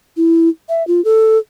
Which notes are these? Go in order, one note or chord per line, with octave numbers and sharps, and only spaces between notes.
E4
E5
F4
A4